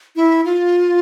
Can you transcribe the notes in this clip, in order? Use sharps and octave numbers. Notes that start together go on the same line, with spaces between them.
E4
F4